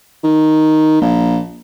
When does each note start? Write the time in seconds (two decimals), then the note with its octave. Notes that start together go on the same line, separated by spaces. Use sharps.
0.24 D#3
1.01 A#1